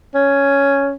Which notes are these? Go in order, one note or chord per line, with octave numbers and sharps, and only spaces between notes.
C#4